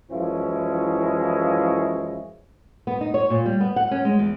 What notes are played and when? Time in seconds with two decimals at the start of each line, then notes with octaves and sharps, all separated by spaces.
0.11 F#2 E3 F3 G#3 C#4 E4
2.87 B3
3.01 D#4
3.14 C#5
3.30 A#2
3.46 G3
3.61 B3
3.76 F#5
3.91 C#4
4.05 G#3
4.19 E2